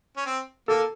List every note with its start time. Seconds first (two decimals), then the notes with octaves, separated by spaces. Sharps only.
0.16 C#4
0.25 C4
0.68 A#3 A4